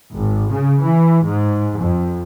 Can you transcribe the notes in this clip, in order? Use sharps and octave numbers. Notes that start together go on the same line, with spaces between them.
G#1
C#3
E3
G#2
F2